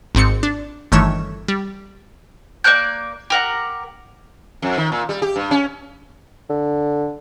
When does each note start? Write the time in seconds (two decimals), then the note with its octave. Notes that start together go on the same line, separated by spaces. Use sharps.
0.15 G#1 G#2 C4 C#7
0.43 D4
0.92 G1 D#3 E3 A3 C#5 E7
1.48 G3
2.64 A#3 D5 F#6 G6
3.30 G4 A#4 F#5
4.62 F2
4.77 D#3
4.92 A#2
5.09 G3
5.22 G4
5.36 G2
5.51 C#4
6.49 D3